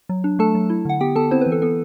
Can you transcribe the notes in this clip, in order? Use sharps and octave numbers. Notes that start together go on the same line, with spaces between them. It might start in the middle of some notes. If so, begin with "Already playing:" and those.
F#3
D4
A3 A4 A5
F#3
E4
D3 F#5
B3 G4 G5
B3 A4 A5
C4 E4 C5
B4
E3
A4
B3 A4